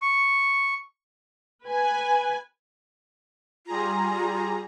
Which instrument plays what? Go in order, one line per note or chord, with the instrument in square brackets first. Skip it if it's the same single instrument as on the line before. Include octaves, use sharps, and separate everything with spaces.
[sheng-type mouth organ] C#6
[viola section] B4 G#5
[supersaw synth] G3 G#4 A#5 [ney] F4